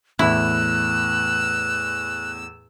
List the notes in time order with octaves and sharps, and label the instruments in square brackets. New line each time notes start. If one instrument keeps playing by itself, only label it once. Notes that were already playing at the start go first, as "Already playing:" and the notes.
[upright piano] E2 A2 [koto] E4 [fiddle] E6 [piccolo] F#6